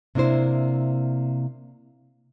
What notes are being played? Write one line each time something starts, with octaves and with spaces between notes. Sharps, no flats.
C3 A#3 D4 E4 C5